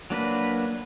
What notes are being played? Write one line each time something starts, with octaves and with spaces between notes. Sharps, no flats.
F#3 A#3 D4 F#4 B4